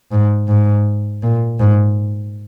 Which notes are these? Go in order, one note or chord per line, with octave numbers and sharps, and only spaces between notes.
G#2
G#2
A#2
G#2